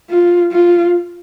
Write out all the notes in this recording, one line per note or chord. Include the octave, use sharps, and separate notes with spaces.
F4
F4